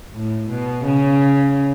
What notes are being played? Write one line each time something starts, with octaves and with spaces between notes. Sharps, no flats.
A2
B2
C#3